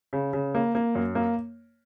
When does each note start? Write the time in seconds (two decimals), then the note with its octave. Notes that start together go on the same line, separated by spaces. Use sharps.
0.13 C#3
0.33 C#3
0.55 A#3
0.75 A#3
0.95 F#2
1.15 A#3